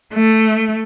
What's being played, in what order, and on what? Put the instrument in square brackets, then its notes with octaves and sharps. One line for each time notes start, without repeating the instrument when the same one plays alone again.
[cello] A3